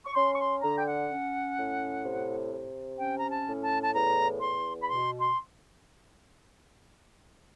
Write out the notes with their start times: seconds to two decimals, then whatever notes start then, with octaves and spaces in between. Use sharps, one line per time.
0.05 C#6
0.15 C#4 C6
0.34 C#6
0.38 C6
0.62 D3 A#5
0.78 G5
0.85 F#5
1.09 C#4
1.57 A2
2.04 C3
2.52 C3
2.98 C#4 G5
3.19 A#5
3.30 A5
3.46 A2
3.62 A5
3.83 A5
3.93 E2 A#5
4.40 E2 C6
4.82 B5
4.88 B2 C6
5.19 C6